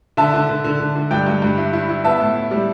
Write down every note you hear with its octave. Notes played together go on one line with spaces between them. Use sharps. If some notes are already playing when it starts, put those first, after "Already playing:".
D3 E5 A5
D3
D3
D3
D3
D3
G2 D5 G5
G2
G2
E4
E4
E4
B3 E5 A5
A2
E4
G3